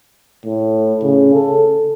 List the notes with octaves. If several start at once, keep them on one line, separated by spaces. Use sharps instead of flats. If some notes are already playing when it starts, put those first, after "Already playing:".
A2
C#3
A4